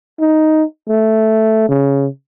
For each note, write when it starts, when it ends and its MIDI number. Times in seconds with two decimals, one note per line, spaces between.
0.20 0.63 63
0.88 1.65 57
1.69 2.07 49